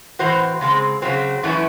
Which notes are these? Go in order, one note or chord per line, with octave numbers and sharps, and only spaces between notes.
A2 E3 C4 F#4 C5
C#3 G#3 C4
C#3 F#3 C4
F#2 E3 A3 C#4 E4